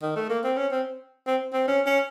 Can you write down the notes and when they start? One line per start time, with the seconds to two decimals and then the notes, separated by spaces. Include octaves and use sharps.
0.02 D#3
0.16 A3
0.29 A#3
0.44 C4
0.57 C#4
0.72 C4
1.27 C4
1.53 C4
1.68 C#4
1.86 C#4